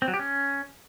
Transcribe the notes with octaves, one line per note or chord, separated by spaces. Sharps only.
C4
F#3
G4
C#4